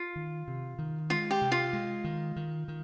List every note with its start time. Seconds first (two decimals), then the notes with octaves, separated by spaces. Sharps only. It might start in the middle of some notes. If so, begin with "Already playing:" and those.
Already playing: F4
0.16 D#3
0.48 C3
0.79 D#3
1.10 G#3 F4
1.31 G4
1.42 C3
1.52 F4
1.73 G#3
2.04 D#3
2.36 D#3
2.68 D#3